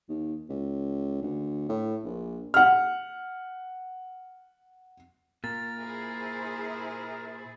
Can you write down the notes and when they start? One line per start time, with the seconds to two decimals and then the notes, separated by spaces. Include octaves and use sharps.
0.09 D#2
0.50 C#2
1.22 D2
1.69 A2
2.04 A#1
2.54 F#5 F6
5.44 A#2 A#4 A6
5.78 E4 G#4 C5